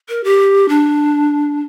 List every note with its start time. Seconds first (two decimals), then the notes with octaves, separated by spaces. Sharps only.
0.09 A#4
0.24 G4
0.69 D4